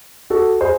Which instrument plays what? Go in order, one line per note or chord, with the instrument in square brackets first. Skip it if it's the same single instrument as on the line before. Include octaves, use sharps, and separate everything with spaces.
[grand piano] F#4 A4
G#4 C5